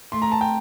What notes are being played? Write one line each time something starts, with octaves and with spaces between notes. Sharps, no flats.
A3 C6
A#5
A5
G5